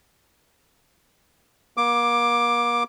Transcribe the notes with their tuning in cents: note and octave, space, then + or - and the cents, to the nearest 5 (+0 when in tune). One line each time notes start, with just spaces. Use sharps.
A#3 +40 D6 +10